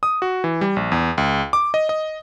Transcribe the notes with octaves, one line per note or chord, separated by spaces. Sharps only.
D#6
F#4
E3
G3
A#1
E2
C#2
D6
D#5
D#5